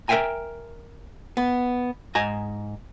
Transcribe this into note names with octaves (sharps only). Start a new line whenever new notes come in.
A#4 E5 F5 G5 G#5 A#5
B3
G#2 D#5 G#5 A#5